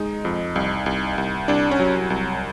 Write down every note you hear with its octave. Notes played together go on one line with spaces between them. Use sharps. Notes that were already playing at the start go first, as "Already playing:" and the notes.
Already playing: G#3 D#4
F2
C2
C2
C2
C2 D4
C#4
F#3
C2